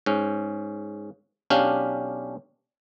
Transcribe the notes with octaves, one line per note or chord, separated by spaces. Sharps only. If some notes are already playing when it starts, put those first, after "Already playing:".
G#2 C#4
B1 C#4 D4 G4 F5